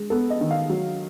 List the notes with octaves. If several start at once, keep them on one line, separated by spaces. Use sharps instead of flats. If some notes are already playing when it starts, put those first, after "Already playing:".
Already playing: G#3
B3 A4
D#5
D#3
F5
F#3